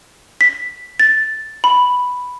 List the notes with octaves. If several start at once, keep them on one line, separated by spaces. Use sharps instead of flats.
B6
A6
B5